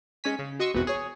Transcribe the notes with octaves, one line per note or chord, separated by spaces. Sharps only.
G#3 C#4 C#5 G#5 B6
C#3
F#4 D#5 C6 C#6 D#6 E6
G#1 E2 B2 B3 F#4
G#4 C#5